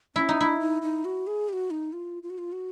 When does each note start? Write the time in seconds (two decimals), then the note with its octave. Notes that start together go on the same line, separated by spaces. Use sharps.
0.16 C#4 E4
0.29 D#4
0.38 D4 E4
0.60 D#4
0.82 D#4
1.05 F#4
1.27 G#4
1.49 G4
1.53 F#4
1.71 D#4
1.93 F4
2.23 F4
2.30 F#4
2.38 F4
2.52 F#4